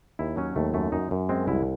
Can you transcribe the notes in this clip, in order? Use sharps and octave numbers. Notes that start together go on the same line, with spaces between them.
D#2 E4
F#3 C#4
D#2 A3
F#2 A3
F#2 D#4
F#2
G#3 C4
C2 E4